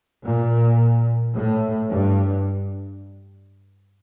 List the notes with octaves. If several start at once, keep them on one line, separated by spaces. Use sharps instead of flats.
A#2
A2
G2